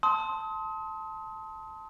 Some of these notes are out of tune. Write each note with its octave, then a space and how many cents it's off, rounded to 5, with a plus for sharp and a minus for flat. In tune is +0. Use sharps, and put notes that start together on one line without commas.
A5 +0 C6 +0 D#6 +35